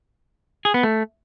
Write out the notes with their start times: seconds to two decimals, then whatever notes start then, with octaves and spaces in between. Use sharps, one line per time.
0.65 G#4
0.74 B3
0.83 A3